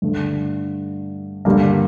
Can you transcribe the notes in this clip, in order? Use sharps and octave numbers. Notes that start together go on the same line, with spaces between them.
G2 D3 A3
G2 D3 G3 A#3